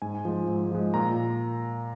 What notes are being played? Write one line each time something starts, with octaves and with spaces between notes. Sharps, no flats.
G#2 G#5
F3 G#3
G#2
F3 G#3
A#2 A#5